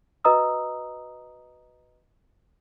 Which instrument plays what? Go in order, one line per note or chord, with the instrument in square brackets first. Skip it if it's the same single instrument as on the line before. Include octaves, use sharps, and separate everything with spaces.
[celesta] F#4 B4 D#5 A#5 D#6 E6